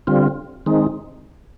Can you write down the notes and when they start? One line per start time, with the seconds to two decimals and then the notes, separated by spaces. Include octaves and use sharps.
0.07 D3 G3 C4 F4
0.66 D#3 G#3 C4 D#4